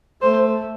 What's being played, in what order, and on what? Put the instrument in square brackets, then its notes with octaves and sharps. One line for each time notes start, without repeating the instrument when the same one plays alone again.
[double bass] A3 [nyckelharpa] C5